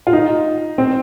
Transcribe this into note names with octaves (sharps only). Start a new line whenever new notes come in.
F4
D#4
C4